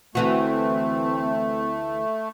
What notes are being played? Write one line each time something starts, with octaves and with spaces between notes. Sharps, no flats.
D2 E3 A3 C4 F#4